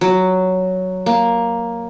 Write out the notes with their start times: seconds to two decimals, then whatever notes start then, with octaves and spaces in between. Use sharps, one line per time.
0.01 F#3
1.06 A#3